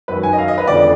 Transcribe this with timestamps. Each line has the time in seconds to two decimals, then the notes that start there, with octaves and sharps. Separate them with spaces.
0.08 F#2 D#3 F#3 B4
0.23 G#5
0.33 D#5
0.38 F5
0.48 D#5
0.58 B4
0.68 F2 D3 F3 D5